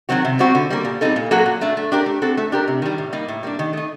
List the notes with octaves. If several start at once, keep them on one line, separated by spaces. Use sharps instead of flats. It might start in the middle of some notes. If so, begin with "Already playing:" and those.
D#3 F#3 C4 F#4
C3
G3 C4 F#4
D3
G3 A#3
A#2
G3 C4 D#4 A4
A#2
F#3 A#3 F#4 A4
A#2
A3 D4
A3
D4 G4 A#4
A3
C4 F#4 A4
A3
D4 G4 A#4
C3
D#3 G3
A2
G3 A#3 D#4
A2
G3 A#3 D4
D#3
A3 D#4